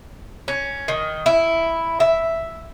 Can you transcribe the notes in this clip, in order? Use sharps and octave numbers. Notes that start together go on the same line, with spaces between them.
C#4
D#3
E4
E5